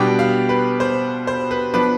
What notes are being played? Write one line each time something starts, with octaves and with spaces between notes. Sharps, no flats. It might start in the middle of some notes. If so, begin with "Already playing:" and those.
Already playing: B2 G3 B3 D4 G5
F5
B4
C5
C5
B4
F3 B3 D4 B4